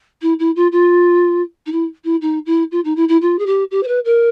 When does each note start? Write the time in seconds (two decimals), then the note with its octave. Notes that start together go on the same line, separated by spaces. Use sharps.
0.22 E4
0.39 E4
0.56 F4
0.72 F4
1.66 D#4
1.72 E4
2.04 E4
2.21 D#4
2.46 E4
2.71 F4
2.84 D#4
2.96 E4
3.08 E4
3.21 F4
3.39 G#4
3.46 G4
3.71 G4
3.83 C5
3.87 B4
4.05 A#4